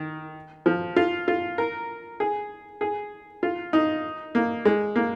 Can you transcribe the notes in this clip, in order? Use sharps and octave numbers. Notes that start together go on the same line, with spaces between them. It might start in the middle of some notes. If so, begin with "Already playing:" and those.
Already playing: D#3
F3
F4
F4
A#4
G#4
G#4
F4
D#4
A#3
G#3
A#3